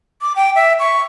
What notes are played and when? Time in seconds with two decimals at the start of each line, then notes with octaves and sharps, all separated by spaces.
0.22 D6
0.36 G5
0.56 E5
0.79 C#6